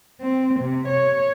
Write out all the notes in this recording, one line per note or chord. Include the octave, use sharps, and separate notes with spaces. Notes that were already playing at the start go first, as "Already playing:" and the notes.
C4
C3
C#5